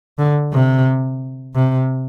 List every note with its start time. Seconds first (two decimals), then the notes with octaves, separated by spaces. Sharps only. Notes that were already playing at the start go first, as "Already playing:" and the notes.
0.18 D3
0.52 C3
1.55 C3